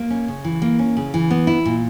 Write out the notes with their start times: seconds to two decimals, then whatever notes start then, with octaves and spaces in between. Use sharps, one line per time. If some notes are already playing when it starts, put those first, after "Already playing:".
Already playing: A#3
0.10 C#4
0.28 C#3
0.44 E3
0.62 A#3
0.79 C#4
0.97 C#3
1.14 E3
1.31 B3
1.47 E4
1.66 A#2